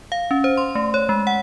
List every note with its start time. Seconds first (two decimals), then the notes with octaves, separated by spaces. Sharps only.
0.12 F5
0.31 C#4
0.44 C5
0.57 C6
0.75 A3
0.94 C#5
1.09 G#3
1.27 F#5